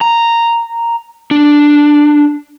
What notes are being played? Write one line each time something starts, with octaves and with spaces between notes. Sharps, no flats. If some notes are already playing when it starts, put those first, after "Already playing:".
A#5
D4